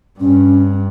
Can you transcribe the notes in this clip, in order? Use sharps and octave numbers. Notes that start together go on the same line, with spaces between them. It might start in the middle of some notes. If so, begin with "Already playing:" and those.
G2 C#4